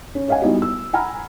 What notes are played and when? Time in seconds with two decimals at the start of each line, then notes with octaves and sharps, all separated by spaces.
0.15 C#4
0.28 C#5 D#5 F5 F#5 G#5
0.42 G3 B3 D#4 E4 F#4
0.62 E6
0.93 F#5 G#5 A#5 B5 F6